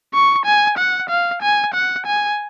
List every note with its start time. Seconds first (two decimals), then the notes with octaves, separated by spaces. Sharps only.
0.14 C#6
0.45 G#5
0.78 F#5
1.09 F5
1.42 G#5
1.74 F#5
2.06 G#5